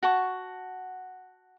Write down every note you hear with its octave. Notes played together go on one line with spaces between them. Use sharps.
F#4 F#5 A5 C#6